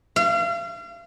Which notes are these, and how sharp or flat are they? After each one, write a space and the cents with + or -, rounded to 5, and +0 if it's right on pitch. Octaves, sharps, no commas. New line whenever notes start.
F5 -35